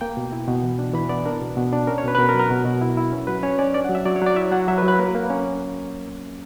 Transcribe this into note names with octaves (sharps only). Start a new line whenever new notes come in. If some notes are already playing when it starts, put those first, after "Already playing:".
A#3 G5
B2
E4
B2
E3
D4
E3 B5
B3 D5
D4 A#4
B2
B2
D4
C#4 A#4
C#5
B2 B4
B4
B2 A#4
A#4
F#3
A#4
B2
B2
E4
E4
C#4
F#3 B4
C#4 C#5
C#4 D5
D4 D5
F#5
F#3
E5
F#3 D5
C#5
F#3 D5
E4 E5
F#3 F#5
F#3 E5
B4
F#3
B4
A#3 A#4
A#3
C#4